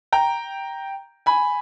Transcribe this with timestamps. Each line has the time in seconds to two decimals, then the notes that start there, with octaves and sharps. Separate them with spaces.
0.12 G5 A#5
1.26 G#5 B5